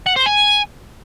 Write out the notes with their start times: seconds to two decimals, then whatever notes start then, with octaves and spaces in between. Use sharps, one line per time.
0.06 F#5
0.16 C5
0.26 G#5